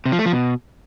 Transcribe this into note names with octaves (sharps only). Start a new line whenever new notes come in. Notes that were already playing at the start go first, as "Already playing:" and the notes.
C3
F3
A3
F3
B2